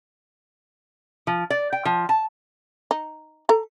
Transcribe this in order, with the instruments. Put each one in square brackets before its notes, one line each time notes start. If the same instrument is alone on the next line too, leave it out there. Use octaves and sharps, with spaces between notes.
[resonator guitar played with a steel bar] F3
D5
G5
F3
A5
[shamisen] D#4
A4 A#5